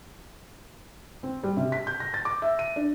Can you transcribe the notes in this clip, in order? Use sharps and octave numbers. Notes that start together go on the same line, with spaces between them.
C4
G3
C3
B6
G6
A#6
A6
D6
E5
D#7
D4